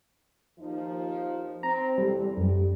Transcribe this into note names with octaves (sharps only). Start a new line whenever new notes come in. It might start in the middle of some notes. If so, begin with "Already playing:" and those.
D#2 F3 D#4
C4 A#5
E2 C3 G3 A4
F#2 G3 G4